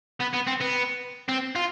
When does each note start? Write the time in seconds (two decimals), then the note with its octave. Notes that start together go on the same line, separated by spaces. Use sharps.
0.20 B3
0.33 B3
0.47 C4
0.61 B3
1.28 C4
1.55 F4